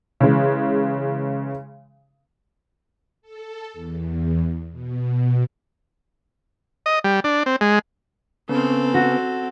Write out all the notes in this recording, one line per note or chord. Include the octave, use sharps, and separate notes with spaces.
C#3 E3 G#3
A4
E2
B2
D#5
G3
D4
C4
G#3
C#3 B3 C4 A4
F#4